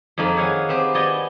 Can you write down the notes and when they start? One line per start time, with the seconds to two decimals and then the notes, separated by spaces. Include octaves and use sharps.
0.18 F2 D#3 A#3 G#4 B5
0.37 G#4 C#5 F5 F#5 G#5
0.69 B3 C4 G4 G#4
0.94 B3 D5 D#5 G5 G#5